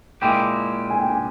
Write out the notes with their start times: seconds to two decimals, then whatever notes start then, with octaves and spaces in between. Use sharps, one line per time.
0.22 A#2 G#3 E4 G4 G5
0.90 G#5
0.99 G5
1.10 G#5